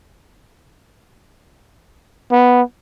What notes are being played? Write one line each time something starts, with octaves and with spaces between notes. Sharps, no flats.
B3